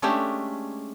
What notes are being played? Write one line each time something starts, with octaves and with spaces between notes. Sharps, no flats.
G#3 A3 C#4 D4 G4 E5